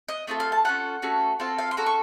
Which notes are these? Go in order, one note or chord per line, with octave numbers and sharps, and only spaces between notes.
D#5
A3 C4 F4 A4 D#5
F5
A5
C#4 F4 A4 F#5
A3 C#4 F#4 A4
C4 F4 A4 F5
F5
C6
C#4 F#4 A4 A#5
C#6